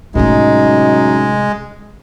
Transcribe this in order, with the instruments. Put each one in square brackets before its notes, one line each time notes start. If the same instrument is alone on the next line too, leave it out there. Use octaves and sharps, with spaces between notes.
[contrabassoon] F#2 [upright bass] A2 C3 [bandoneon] G#3 [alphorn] D#4